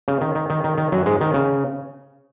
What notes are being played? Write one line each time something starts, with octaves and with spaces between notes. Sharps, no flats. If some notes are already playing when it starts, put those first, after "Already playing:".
C#3
D#3
D#3
D#3
D#3
D#3
F#2 F#3
G#2 G#3
D#3
C#3